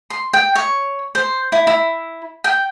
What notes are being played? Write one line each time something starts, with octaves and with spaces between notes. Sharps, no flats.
C6
G5
C#5
C5
E4
E4
G5